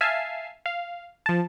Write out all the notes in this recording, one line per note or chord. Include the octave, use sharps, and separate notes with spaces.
E5 F5 G#5 A5 C7
F5
F3 A5